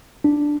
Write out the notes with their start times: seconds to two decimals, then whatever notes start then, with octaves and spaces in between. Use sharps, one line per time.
0.24 D4